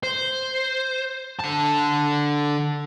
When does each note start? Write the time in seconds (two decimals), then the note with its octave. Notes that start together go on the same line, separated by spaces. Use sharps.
0.03 C5
1.39 D3 A5